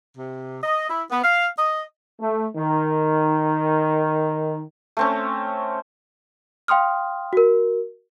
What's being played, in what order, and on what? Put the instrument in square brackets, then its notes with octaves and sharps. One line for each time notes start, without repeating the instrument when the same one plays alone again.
[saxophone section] C3
D#5
E4
B3
F5
D#5
[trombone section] A3
D#3
[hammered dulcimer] A3 C4 C#4
[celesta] F5 G5 C6 D#6 F6
F#4 A#4